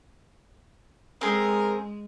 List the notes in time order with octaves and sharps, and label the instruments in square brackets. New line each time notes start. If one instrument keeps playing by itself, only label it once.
[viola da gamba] G#3 [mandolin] C4 G#4 [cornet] A#4